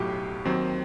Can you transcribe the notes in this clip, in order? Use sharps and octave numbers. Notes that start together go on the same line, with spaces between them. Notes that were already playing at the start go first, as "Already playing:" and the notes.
Already playing: B1 A2 F#3 G4
D#2 D#3 F#3 C4